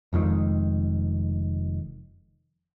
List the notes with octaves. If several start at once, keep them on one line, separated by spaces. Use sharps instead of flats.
F1 F2 D#3 G#3